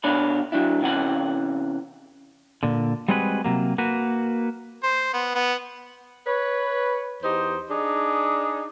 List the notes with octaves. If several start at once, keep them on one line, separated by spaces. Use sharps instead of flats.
B2 D4 C#5 D5 B5
F#3 D4 E4
C3 E3 C#4 F#5
A#2 D3
G3 G#3 C4 F#4 G#4 B4
C3 F#3 A#3
A#3 F#4 B4
C5
B3
B3
B4 C#5
E2 D#4 G4 C5
D4 D#4 G#4